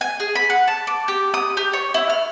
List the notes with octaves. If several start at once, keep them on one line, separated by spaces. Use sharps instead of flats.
G#5
G#4
B5
F#5
A5
D6
G4
D#6
G4
C#5
E4
F6